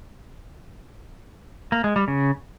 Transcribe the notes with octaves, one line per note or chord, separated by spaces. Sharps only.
A#3
G#3
G3
C#3